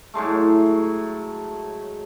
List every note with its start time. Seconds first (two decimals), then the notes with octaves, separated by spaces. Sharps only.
0.14 A2 F#3 G#3 A3